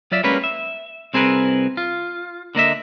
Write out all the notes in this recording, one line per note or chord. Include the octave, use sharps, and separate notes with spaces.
F#3 F4 D5 E5
G3 G#3 A#3 C#4 B4
E5
C2 C4 G#4 A#4 B4
F4
D3 A#3 D#5 E5